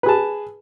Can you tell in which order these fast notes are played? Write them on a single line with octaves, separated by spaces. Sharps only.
B4 G#4 A5